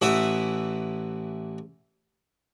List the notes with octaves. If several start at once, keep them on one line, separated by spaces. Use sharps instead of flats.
A1 E3 E5 F#5 D#6